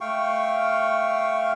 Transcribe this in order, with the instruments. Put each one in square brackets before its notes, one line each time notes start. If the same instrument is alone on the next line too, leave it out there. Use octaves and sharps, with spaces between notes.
[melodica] A3 F5 G5 C#6